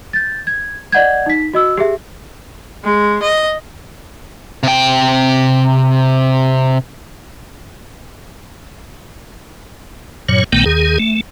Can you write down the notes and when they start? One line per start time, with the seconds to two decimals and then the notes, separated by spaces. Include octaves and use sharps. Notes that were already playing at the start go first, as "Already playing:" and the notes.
0.13 G6 A6
0.47 G#6
0.92 D5 D#5 F#5 G6 G#6
1.26 D#4 B6
1.53 F#4 D#5 E6
1.77 G4 G#4 E5
2.84 G#3
3.23 D#5
4.63 C3 G5
10.29 G2 A#2 F#3 C#5
10.52 A#1 A#2 D#3 A3 B3 G5
10.66 D#2 D#3 G#4
10.99 A3